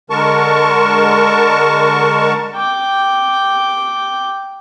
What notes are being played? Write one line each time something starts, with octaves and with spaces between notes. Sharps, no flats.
D3 G#3 A#4 A5 C#6
G5 D6